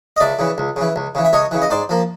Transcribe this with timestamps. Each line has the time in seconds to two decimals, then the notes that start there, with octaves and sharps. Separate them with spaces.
0.17 D#5
0.20 C#2 D5 E5
0.39 C#3 E3
0.58 C#2
0.76 C#3 E3
0.96 C#2
1.15 C#3 E3
1.25 E5
1.33 C#2 C#5 D#5
1.51 C#3 E3
1.62 D#5
1.70 G#2 C5 D5
1.89 F3 A#3